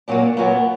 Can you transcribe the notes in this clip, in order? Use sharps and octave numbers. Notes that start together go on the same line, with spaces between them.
A#2 F#3 A#3 D4
A#2 F#3 A#3 B3